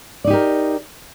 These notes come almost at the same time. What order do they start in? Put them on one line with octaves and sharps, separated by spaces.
D5 D#4 G4 A#4